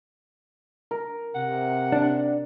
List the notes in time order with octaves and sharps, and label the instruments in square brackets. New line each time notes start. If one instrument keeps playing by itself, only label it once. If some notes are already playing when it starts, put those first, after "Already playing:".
[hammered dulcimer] A#4
[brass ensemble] C3 [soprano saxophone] F#5
[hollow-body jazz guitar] D4